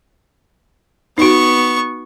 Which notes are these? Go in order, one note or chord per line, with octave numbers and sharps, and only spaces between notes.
B3 D#4 F#4 C#6